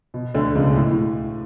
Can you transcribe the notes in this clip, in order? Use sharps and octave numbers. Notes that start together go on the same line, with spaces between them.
B2
D2 D3
C#2 C#3
B2
A2
A2